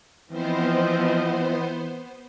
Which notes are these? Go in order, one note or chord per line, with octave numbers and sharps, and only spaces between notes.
E3 F3 B3 C4 C5 D#5